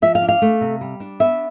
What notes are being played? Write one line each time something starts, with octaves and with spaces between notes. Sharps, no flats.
F3 E5
F5
D4
F5
A3
C3
G3
D4
B3 E5